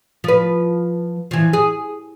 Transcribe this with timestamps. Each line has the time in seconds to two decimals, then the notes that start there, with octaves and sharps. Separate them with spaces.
0.24 F3 B4
1.31 E3 F3
1.53 G#4